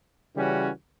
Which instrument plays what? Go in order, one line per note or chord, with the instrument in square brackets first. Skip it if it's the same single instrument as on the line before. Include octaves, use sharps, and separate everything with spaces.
[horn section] C#3 E3 G3 C#4 F#4